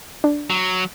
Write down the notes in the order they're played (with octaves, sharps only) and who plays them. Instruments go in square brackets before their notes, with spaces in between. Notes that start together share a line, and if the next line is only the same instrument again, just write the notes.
[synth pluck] D4
[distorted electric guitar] F#3